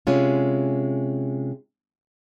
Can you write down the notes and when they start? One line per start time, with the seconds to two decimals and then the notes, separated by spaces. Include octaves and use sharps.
0.07 C3 G#3 C#4 F4